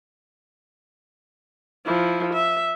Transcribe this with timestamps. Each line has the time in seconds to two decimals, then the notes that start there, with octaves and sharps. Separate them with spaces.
1.86 F3 E4
2.33 E5